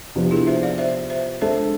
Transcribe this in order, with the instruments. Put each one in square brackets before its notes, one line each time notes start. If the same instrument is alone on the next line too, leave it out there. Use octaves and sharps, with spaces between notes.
[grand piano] C3 F3 B3 D4
[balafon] E4 G#4
C5 E5
D5 F5
C5 E5
C5 E5
[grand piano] G#3 D4 A4 [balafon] C5 E5